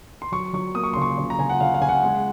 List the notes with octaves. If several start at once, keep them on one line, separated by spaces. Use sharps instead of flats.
C6
F#3 C#6
F#3 C#6
A#3 D#6
C#6
C#3 C6
C#6
C#3
A#5
C#3 G#5
F#5
C#3 F5
F5
C#3 G#5
F#5
G#3